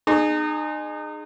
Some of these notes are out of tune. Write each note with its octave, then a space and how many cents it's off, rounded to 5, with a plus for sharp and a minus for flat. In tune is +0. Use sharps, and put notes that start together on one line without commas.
D#4 -35 G#4 +5 C6 +0